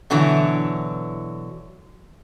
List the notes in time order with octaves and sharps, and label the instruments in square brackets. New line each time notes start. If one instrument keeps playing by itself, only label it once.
[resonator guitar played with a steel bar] B2 D3 E3 F#3 E4